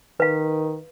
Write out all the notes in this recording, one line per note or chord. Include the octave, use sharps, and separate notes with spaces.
D#3 B4 F5